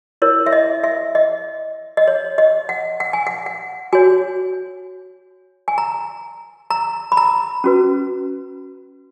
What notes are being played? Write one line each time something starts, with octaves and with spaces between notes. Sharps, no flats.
E4 A#4 C#5
E5
D#5
E5
D#5
D#5
C#5
D#5
F#5
F#5
G#5
F#5
F#5
F#4 C#5 G#5
G#5
A#5
A#5
B5
A#5
C#4 F#4 B4